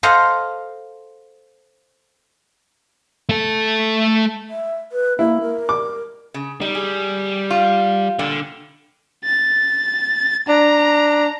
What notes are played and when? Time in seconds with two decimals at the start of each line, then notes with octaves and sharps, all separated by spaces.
0.03 A4 C5 D#5 F5 F#5
3.29 A3 A4
4.50 E5
4.92 B4
5.19 A#3 E4
5.41 A#4
5.69 D6
6.34 C#3
6.61 G3 D#4
6.75 G#4
7.50 F4
8.19 A#2 D3 G3
9.25 A6
10.48 D4 A#5